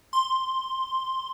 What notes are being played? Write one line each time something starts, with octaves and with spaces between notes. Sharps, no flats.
C6